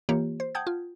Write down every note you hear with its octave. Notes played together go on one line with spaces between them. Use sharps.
E3 A#3 F4 G4 C#5
C5
F#5 G5 A5 D#6 G6 G#6
F4